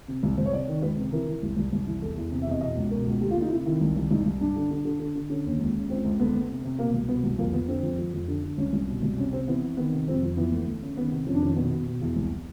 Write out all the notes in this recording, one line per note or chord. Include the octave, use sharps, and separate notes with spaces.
C3
C2
C2 C5
C#5
C3 D5
D#3
C#2 B4
C3
E3 A#4
E3
C2
C2
C2
E3
E2 A4
E2
C3
E5
E2 D#5
B2 D#5
C#2
B2 A#4
C#2
D2 G4
F4
D2
D#4
C3 E4
D#3 E4
C2
C2
C2 D#4
C2
G2 D4
D3
D3
D3
D3
D3
D3 C#4
D#2
C#2
C#3
C#2 C4
C#2
D2 B3
D2
C3
C3
B2 A#3
C2
B2 B3
C2
F2 A#3
F2 B3
D3 C4
F2
F2
F2
D3
D3
C2 C#4
C2
B2
C2
C3 C#4
C3 C4
E3 B3
C3
D#3 B3
C3
F2 C4
F2
E3 B3
D2
D2
C#3
D#3 B3
C3
F2 C#4
D4
D#3 C#4
B2 B3
B2
B2
E2
C2